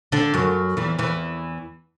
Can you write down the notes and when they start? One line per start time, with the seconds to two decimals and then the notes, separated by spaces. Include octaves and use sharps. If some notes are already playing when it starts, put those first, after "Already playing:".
0.12 D3 D4
0.34 F#2 F#3
0.77 E2 E3
0.98 E2 E3